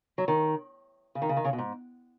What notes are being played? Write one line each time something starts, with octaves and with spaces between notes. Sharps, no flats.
F#3
D#3
C#3
D#3
C#3
D#3
C#3
B2
G#2